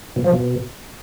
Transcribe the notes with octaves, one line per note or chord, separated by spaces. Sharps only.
B2
F3
B2